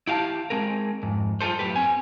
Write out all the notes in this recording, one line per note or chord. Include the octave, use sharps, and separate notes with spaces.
E4 G4 F5 G#5 A5
G#3 C4 G#4 A#4
F2 G#2
G2 F4 G#4 A4 C5
F#2 A2 G4 B4
C4 G#5